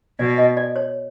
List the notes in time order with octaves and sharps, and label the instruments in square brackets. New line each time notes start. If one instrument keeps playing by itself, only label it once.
[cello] B2 [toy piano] D5
[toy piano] D#5
D5
C#5